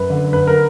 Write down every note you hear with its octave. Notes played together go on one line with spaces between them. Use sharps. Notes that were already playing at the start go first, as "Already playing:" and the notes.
Already playing: F#2 B4
D3
F#2 B4
A#4